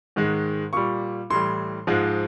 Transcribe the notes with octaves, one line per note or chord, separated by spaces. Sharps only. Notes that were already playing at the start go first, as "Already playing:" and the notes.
G#2 D#3 G#3
A#2 G3 C#6
A2 E3 G3 C6
G#2 F3 G#3